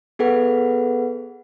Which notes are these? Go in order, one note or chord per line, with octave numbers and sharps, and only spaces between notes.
B3 G#4 A4 B4 F#5